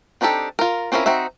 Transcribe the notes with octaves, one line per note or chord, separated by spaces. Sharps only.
C4 D4 D#4 G4 A4
F4 A#4
C4 C#4 E4 F4 A#4
C4 D#4 F#4 E5